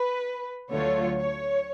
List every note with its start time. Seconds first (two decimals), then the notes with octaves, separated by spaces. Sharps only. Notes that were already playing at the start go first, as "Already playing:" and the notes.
Already playing: B4
0.72 D2 D3 F#3 A3 F4 C#5
1.18 C#5